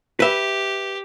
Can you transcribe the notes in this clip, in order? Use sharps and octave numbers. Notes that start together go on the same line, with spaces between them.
G4 B4 E5